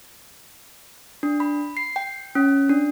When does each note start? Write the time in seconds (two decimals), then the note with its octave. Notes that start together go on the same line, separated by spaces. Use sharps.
1.23 D4
1.40 B5
1.77 C7
1.96 G5
2.35 C#4
2.69 D4